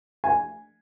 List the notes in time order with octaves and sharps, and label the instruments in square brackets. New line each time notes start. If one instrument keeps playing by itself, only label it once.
[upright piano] G#5